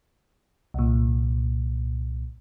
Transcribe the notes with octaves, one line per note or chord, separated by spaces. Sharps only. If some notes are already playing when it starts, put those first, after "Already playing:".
C2 A#2